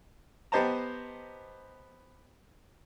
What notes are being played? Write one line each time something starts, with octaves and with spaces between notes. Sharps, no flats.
B3 G4 C5 D#5 A5 A#5